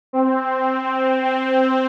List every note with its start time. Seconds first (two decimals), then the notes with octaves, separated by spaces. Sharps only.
0.13 C4
1.25 C4